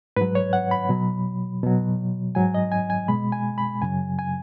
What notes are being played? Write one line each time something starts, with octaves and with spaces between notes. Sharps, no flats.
G#2 F#3 B4
C#5
F#5
B5
B2 F#3
B2 F#3
G#2 F#3 G#5
D#5
G#5
G#5
B2 G#3 B5
G#5
B5
F#2 C#3 F#3 G#5
G#5